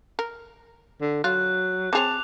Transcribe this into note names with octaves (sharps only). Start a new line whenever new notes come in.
A#4
D3
F#3 F4 F#6
C4 G#4 C#5 A5 D6 F7